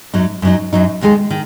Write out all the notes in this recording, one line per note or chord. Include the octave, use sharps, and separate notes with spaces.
F#2 F#3 D#4
F#2 F#3 D#4
F#2 F#3 D#4
D#2 D#3 G#3 D#4 G#4
D#3